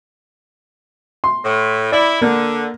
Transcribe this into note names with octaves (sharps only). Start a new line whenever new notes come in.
C6
A2
E4 D5
D3 A#3